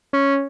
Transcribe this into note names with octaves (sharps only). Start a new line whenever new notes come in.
C#4